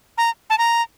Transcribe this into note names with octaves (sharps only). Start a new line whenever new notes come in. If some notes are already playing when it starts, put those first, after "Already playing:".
A#5
A5
A#5